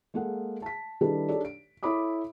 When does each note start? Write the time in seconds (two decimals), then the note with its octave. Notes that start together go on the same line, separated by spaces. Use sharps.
0.14 G#3 A#3 G#4 A4 F#5
0.62 A5 B6
1.01 D#3 G3 D4 E4 A4 B4
1.28 D4 D#4 G4 A4 C#5 D5
1.45 D7
1.83 E4 A4 C#5 B5 D6 D#6